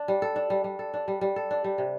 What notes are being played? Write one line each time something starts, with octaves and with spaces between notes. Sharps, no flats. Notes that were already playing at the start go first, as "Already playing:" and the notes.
Already playing: D4
G3
A4
D4
G3
G3
A4
D4
G3
G3
A4
D4
G3
C3